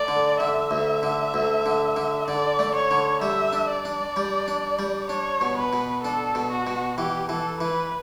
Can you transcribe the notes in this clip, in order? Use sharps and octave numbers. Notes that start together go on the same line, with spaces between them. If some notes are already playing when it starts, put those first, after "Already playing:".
Already playing: A3 D5
D3
D3 E5
D2
D3
D2
D3
D3
D3 D5
A3
C#5
D3
G3 E5
D4
D5
D4
G3
D4
G3
D4 C#5
B2
B4
B2
D4 A4
B2
F#4
B2
E3 G4
E3 A4
E3 B4